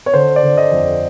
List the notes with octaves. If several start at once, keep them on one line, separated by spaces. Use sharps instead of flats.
C#5
D3 C5
D5
D3
D#5
F2